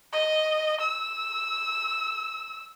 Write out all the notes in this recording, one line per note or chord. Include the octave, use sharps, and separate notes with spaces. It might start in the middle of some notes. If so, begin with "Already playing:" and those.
D#5
E6